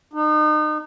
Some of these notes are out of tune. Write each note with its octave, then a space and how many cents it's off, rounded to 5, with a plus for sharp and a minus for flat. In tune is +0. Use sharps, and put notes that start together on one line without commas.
D#4 -35